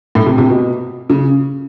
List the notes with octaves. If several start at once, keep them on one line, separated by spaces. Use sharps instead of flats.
A2
C3
C3
B2
C#3